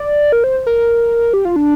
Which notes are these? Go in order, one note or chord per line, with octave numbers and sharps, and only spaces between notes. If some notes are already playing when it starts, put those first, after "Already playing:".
Already playing: D5
A#4
C5
A#4
G4
F4
D4